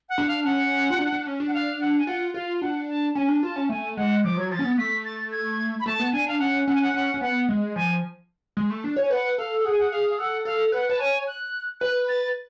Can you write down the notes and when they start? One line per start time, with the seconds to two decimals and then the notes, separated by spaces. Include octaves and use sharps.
0.09 F#5
0.18 D4
0.28 F5
0.45 C#4 F#5
0.90 F4
0.99 D4
1.12 D4
1.27 C#4
1.40 D4
1.47 F#5
1.54 F5
1.80 F#5
1.98 G#5
2.07 F4 F#5
2.34 F4 F5
2.61 D4 F#5
2.88 A5
3.15 C#4 G#5
3.28 D4
3.42 F4 A5
3.56 C#4
3.69 A3 G#5
3.96 G#3 F#5
4.24 F3 D6
4.37 F#3 G#6
4.51 F3 A6
4.59 C#4
4.64 B3
4.78 A3 B6
5.05 A6
5.32 G#6
5.80 B5
5.86 A3 A5
6.00 B3
6.12 D4 G#5
6.26 D4 F5
6.40 C#4 F#5
6.68 C#4 F#5
6.75 G#5
6.82 F#5
6.94 C#4 F#5
7.14 C#4
7.21 B3 F#5
7.48 G#3
7.76 F3 G#5
8.57 G#3
8.70 A3
8.84 D4
8.96 C#5
9.02 G#5
9.10 B4 F#5
9.38 A4 F5
9.64 G#4 F#5
9.72 G#5
9.79 F#5
9.91 G#4 F5
10.10 F5
10.19 A4 F#5
10.45 A4 F5
10.72 B4 F#5
10.89 B4 A5
10.99 C#5 G#5
11.27 F#6
11.80 B4 F#6
12.09 A6